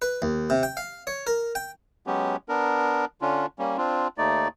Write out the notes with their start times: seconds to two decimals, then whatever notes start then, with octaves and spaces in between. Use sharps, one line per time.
0.02 B4
0.22 D#2
0.50 C3
0.63 G5
0.77 F5
1.07 C#5
1.27 A#4
1.55 G5
2.07 F#3 G#3 B3 C#4 G4
2.49 B3 D4 A#4
3.22 D3 C#4 D4 F4
3.59 G3 A#3 C#4
3.78 C4 D4 F4
4.18 D#2 A3 D#4 D5